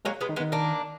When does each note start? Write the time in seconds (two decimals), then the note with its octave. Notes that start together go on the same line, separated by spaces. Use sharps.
0.05 F#3 G#3 A#3
0.21 G#3 B3
0.29 D#3
0.36 G#3 B3
0.40 D#3
0.52 A#3 D4